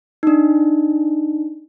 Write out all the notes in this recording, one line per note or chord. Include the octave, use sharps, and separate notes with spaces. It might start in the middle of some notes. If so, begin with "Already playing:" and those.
D4 D#4